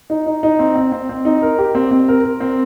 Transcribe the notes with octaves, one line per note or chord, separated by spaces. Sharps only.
D#4
D#4
D#4
C4
C4
C4
C4
D#4
A#4
G4
C4
C4
A#4
A#4
C4